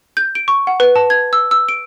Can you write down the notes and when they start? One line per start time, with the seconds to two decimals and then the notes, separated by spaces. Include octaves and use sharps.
0.17 G6
0.35 D7
0.48 C#6
0.67 F#5
0.80 B4
0.96 A5
1.10 G#6
1.33 E6
1.51 E6
1.68 D7